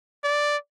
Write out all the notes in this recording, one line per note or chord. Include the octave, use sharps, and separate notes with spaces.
D5